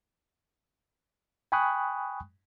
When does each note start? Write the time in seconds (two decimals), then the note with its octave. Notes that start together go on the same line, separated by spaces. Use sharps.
1.52 G5 G#5 B5 C#6 D#6 F#6